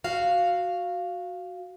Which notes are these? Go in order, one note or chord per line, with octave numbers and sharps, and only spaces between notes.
F#4 F5